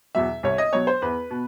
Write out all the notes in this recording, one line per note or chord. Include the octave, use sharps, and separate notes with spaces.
E2 B2 F#3 E5
C2 C#5
D#5
B2 F#3 C#5
C5
E2 B4
B2